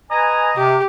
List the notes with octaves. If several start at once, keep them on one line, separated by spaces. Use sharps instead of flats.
B4 D#5 G#5 A#5
C3 G4